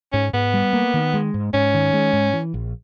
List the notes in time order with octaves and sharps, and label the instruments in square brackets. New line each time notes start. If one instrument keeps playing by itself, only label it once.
[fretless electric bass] G#2 [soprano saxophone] C#4
[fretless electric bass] G#2 [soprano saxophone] B3
[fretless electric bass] G3
A#3
D#3
G#3
G#2
[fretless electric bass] G#2 [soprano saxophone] C#4
[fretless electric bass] D#3
G#3
G#2
E3
A#1